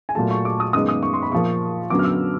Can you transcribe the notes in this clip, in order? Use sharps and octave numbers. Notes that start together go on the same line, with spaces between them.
G#5
A#2 F#3 A3 A5
C#6
D6
D#6
F#2 D#3 G#3 B3 D#6
D#6
C#6
C6
B5
A#2 F3 A#3 C#6
F#2 D3 F#3 B3 D6
F6
E6